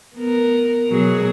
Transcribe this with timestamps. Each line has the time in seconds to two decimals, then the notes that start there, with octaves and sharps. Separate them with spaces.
0.16 B3 A#4
0.88 B2 F#3 G#4